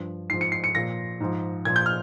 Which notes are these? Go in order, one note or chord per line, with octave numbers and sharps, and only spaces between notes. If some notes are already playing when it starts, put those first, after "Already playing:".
Already playing: G2 F3
G#2 F3 C7
C#7
C7
C#7
A#2 F3 A#6
G#2 F3
A#2 F3 G#6
G6
F6